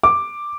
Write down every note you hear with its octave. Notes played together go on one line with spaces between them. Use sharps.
D6